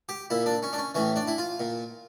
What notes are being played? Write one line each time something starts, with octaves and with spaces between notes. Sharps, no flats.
G4
A#2 E4
D4
C#4
D4
C#4
A2 E3 C#4
D4
E4
F4
A#2